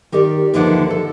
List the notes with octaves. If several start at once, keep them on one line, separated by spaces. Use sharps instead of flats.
D#3 G4 A#4 D5
D#2 D3 E3 F3 D4 F#5
A4